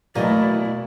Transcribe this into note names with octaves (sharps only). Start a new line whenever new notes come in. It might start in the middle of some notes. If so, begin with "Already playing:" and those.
E2 B2 F#3 A3 A#3 E4 D5 D#5